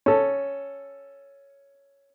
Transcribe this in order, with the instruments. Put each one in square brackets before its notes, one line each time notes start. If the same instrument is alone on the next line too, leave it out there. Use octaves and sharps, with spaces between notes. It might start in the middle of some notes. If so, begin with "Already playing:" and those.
[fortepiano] C#4 A4